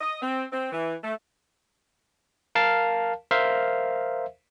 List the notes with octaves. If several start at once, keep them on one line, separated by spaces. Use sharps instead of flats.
D#5
C4
C4
E3
A3
A#4 F5 A5
A#4 C5 E5 F5